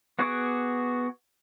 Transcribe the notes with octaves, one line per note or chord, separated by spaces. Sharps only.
B3 F#4 G#4 C#6 D6